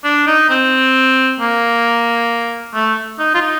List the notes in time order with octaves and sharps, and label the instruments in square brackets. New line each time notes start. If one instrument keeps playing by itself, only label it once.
[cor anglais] D4
D#4
C4
A#3
A3
D#4
F4
D#4